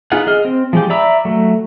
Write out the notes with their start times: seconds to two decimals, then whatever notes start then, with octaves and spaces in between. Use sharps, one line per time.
0.12 B3 D#4 F4 G#4 F#5
0.27 G#4 D#5 F6
0.45 C4
0.73 F3 G#3 G4
0.90 D5 E5 A#5 B5 E6
1.25 F#3 A3